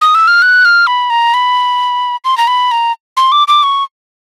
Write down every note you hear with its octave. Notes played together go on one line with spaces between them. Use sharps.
D#6
E6
F6
F#6
F6
B5
A#5
B5
C6
A#5
B5
A#5
C6
D6
D6
C#6